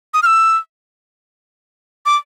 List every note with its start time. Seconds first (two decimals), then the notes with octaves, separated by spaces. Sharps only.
0.14 D#6
0.23 F6
0.26 E6
2.06 D6